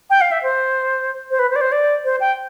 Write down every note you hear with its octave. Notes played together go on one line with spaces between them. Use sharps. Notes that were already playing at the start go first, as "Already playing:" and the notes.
G5
F5
E5
C5
C5
B4
C5
D5
C5
D5
C5
G5